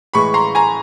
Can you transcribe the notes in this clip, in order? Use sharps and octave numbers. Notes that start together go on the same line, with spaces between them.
A2 E3 G#3 B5 C#6
A#5 C6
G#5 A#5